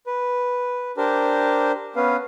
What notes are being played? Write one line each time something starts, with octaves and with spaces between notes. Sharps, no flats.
B4
D4 G4 A#4 C5
B3 C#4 B4 F5